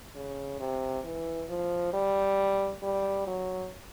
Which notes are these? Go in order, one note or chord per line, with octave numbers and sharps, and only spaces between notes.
C#3
C3
E3
F3
G3
G3
F#3